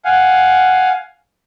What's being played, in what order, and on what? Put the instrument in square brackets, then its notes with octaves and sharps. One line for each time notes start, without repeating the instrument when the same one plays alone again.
[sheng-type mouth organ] F5 F#5 G#5